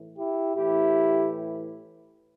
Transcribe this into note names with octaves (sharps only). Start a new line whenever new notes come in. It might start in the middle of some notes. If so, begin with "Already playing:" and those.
Already playing: A2 E3
E4 G4
A2 E3 E4 G4